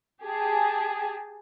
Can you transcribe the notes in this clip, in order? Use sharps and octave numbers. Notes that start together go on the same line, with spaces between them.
G4 G#4 G#5 A5